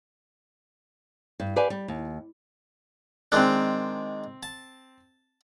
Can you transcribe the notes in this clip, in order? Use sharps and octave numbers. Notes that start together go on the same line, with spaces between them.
G2
G4 B4 D5 F5 G#5
G3
D#2
D#3 G#3 C4 D4 F#6
A5